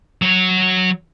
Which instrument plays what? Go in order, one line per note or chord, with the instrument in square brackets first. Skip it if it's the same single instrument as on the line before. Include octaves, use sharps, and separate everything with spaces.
[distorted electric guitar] F#3 C#5